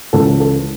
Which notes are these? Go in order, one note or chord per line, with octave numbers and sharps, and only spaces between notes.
C#2 C#3 E3 A4
A4